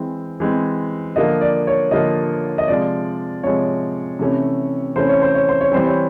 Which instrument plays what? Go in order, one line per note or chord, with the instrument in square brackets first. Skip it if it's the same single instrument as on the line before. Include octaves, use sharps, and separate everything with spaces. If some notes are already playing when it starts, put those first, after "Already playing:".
Already playing: [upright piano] E3 G#3 C4
E3 G#3 C4
D3 F3 A#3 D#5
D5
C#5
D3 F3 A#3 D#5
D#5
C3 F3 G#3 D5
C3 F3 G#3 C#5
C3 E3 A3 C#4
C3 E3 A3 C#4 C5
C#5
C5
C#5
C5
C#5
E3 G3 C4 C5
C#5